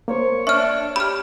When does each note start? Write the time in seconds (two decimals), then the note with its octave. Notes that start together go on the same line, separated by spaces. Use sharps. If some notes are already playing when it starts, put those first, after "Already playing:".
0.08 A#3 C5 C#5
0.47 D4 E5 C#6 F6
0.96 G4 B5 F6